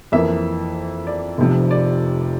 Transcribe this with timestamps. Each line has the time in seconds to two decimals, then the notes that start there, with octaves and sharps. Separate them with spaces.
0.12 F2 E3 A#3 E5
1.07 D5
1.38 F1 F2 C3 F3
1.71 D5